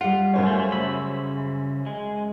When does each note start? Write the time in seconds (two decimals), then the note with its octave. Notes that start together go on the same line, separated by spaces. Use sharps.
0.01 G3 F4 F#5
0.34 F#2 C5 C#5
0.46 A3
0.72 C#3 B5 E6
1.86 G#3